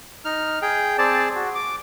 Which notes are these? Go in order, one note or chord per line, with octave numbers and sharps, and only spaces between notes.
D#4 F6
G#4 G5
C4 G#4 D5 A5
F#4
D6